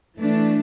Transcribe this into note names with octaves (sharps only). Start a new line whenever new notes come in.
E3 A3 D4